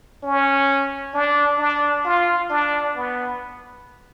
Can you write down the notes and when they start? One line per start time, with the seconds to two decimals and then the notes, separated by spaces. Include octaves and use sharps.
0.23 C#4
1.14 D4
1.59 D4
2.05 F4
2.50 D4
2.96 B3